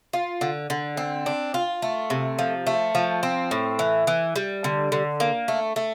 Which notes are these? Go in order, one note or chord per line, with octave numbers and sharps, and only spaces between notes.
F4
D3
D3
C4
D4
F4
A3
C3
F3
A3
F3
C4
A2
E3
E3
G3
D3
D3
A#3
A3
A3